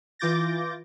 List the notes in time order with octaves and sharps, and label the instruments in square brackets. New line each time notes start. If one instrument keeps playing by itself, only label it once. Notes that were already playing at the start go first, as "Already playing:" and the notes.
[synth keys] E3 F4 D6 G6 A6 A#6